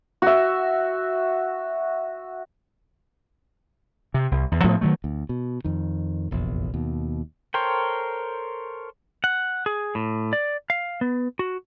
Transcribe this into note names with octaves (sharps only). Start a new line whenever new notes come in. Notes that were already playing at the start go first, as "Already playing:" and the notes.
F#4 E5
C3
C2
E2
A2 F3 A3 B3
D#3 F#3 A3
D2
B2
F2 D#3
F1 A#1 E2
D#2 B2
A4 A#4 C5 C#5 G5
F#5
G#4
A2
D5
F5
B3
F#4